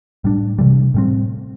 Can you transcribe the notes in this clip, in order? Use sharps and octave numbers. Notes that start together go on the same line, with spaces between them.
A2 G3 D4
C3 E3 G3
A2 G3 C4